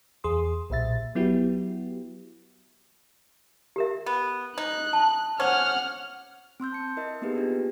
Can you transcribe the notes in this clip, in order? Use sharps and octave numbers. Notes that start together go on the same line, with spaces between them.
E2 G#4 C6 D#6
B1 A#2 E5 A6
F#3 B3 E4 F#4 G4
G4 A#4 E5
B3
D#4 F#6
A5
C#4 C5 F#5 D6 F6
C4 C6 E6 G6
A5 C#7
E4 A#4 D#5
A#3 B3 D#4 G4 G#4 B4
A#3 D4 F4 G4